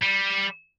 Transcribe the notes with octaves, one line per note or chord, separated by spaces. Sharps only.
G3